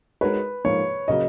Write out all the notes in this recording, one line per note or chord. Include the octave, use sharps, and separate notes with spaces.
G#3 D#4 F#4 A#4 B4 C#5
G#2 F3 A#3 C#5
C#3 F#3 A#3 D#5